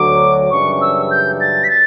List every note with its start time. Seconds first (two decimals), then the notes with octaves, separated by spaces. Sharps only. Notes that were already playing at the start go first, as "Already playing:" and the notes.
Already playing: D2 D3 F#3 D6
0.51 F#2 C#3 E3 G3 D4 C#6
0.81 E6
1.11 G6
1.40 A6
1.64 B6
1.70 A6